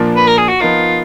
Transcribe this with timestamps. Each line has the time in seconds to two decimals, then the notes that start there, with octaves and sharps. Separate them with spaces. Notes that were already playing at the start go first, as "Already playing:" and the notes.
Already playing: A#2 F3 A#3 D4 F4
0.16 B4
0.27 A#4
0.38 G#4
0.49 F#4
0.60 F3 B3 D#4 F4 A#4